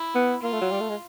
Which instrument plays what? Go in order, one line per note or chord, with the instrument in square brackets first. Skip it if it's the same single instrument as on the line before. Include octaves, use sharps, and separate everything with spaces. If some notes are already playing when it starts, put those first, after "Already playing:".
Already playing: [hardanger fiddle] E4
[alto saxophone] B3
[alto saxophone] A#3 [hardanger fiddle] F4
[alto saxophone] A3
F#3
G3
A3
G#3